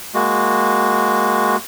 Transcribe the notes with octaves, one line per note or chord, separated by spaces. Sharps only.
G#3 A#3 F#4